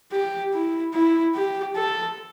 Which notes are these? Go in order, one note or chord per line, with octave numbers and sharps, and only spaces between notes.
G4
E4
E4
G4
A4